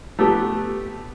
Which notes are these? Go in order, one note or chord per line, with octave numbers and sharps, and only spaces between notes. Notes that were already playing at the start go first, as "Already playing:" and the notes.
A3 B3 G4 A4